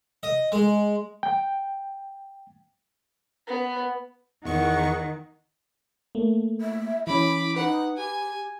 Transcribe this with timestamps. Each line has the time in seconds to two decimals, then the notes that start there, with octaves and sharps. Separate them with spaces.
0.23 D#5
0.52 G#3
1.23 G5
3.48 B3
4.45 E2 D#3 F#5 C#6
6.15 A3 A#3
6.61 E5
7.07 E3 C#4 E4 B5 D6
7.56 D#4 B4 F#5
7.97 G4 G#5